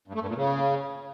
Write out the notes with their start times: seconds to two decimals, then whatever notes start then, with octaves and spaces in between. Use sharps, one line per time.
0.08 G2
0.15 A3
0.22 G2
0.29 A#2
0.36 C#3